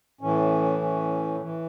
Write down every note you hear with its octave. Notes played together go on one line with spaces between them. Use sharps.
A2 E3 C#4
C#4
E3